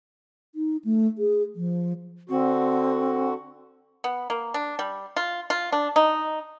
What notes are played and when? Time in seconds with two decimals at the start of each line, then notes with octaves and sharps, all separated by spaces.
0.55 D#4
0.84 A3
1.18 G#4
1.55 F3
2.29 D3 C4 F#4
4.04 B3
4.30 A#3
4.54 D4
4.79 G3
5.17 F4
5.50 F4
5.72 D4
5.96 D#4